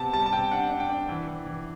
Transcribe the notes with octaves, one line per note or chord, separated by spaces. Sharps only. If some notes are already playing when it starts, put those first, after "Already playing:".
Already playing: C3 B3 A5
G3 A5
A5
C3 G5
D4 F#5
D4
G5
D4
E3
E3
E3